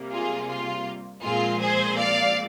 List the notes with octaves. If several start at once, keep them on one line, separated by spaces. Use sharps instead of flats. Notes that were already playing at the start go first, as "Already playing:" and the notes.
Already playing: C3 G3 A#3
F4 G#4
F4
A#2 F3 G#3 C4 F4 G#4
G#4 C5
D5 F5